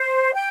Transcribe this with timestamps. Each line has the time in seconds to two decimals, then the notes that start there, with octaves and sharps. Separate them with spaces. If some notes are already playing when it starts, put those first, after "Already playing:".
Already playing: C5
0.34 G5